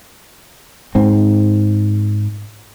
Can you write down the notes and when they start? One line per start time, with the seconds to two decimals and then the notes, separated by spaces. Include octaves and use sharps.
0.95 G#2 C4